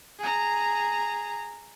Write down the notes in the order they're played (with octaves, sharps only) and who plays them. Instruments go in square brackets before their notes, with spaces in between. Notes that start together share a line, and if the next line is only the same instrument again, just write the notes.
[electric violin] G#4 A#5